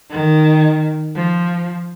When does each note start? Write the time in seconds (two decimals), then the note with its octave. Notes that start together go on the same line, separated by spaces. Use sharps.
0.11 D#3
1.15 F3